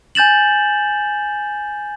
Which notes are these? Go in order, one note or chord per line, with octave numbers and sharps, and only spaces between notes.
G#5 G6 A6 E7 F#7